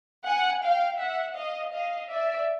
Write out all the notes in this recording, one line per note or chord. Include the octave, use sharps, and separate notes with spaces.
F#5 G#5
F5 G5
E5 F#5
D#5 F5
D#5 F5
D5 E5